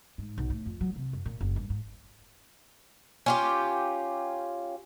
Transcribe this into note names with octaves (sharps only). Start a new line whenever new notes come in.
G#2
B1
A2
F2
F#3
C3
F#2
A#2
F#1
G2
G#2
C#4 F4 G4